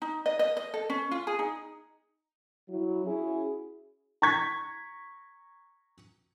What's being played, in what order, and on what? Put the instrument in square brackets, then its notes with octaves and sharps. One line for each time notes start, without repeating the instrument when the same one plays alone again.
[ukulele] D#4
D#5
D#5
D#5
A4
C#4
F4
G#4
D#4
[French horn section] F#3 E4
C#4 E4 F#4 G#4
[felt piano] A#5 C#6 G#6 B6